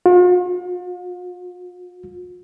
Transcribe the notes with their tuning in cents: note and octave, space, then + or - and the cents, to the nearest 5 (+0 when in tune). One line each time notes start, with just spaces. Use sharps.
F4 +45